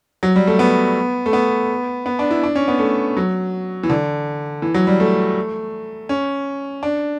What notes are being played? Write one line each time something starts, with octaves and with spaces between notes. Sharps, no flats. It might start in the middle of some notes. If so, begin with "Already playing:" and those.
F#3
G3
A3
B3
A3
B3
B3
D4
E4
D4
C#4
B3
A3
F#3
E3
D3
E3
F#3
G3
A3
C#4
D4